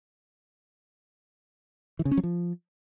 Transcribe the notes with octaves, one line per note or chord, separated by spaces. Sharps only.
E3
C#3
C#4
F#3
F3